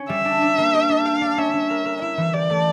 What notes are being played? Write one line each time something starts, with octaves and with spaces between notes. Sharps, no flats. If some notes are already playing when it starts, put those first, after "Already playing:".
Already playing: C#4
G3 E5
D4
D4
A#3
G4
D4
G4 F5
D4
C#4 E5
C#4
A#4
A#4
E4 E5
E3
G4 D5
A3